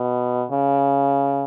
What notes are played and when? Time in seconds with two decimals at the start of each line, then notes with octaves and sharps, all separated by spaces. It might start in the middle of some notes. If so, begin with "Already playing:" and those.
Already playing: B2
0.51 C#3